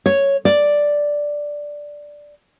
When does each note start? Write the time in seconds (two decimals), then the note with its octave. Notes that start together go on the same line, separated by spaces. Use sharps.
0.06 C#5
0.45 D5